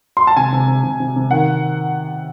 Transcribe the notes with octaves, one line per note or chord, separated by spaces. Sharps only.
C6
A5
C3 G#5
C3
C3
C3
C3
C3
D#3 F#5